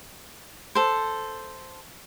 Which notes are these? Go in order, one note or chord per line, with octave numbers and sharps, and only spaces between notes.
A4 C5